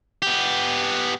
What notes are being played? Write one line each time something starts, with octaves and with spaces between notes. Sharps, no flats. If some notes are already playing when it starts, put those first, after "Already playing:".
B3 G4